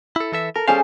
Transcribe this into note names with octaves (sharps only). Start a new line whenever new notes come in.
E4 A4
E3 A4 E5
A4 A#4
G3 C#4 G#4 C5 F5 D6